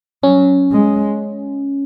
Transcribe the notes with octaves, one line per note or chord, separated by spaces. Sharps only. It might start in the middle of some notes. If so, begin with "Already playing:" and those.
F#3 C#4
G#3